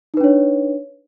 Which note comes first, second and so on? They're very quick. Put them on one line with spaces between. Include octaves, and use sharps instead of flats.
D#4 B4 D4 C#5